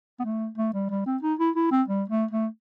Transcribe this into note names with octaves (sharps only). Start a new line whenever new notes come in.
B3
A3
A3
G3
G3
C4
D#4
E4
E4
C4
G3
A3
A3